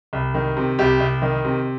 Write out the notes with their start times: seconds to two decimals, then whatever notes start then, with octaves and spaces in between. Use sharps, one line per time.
0.13 C2
0.34 D#3
0.57 C3
0.79 C2 G4
1.00 C2
1.22 D#3
1.45 C3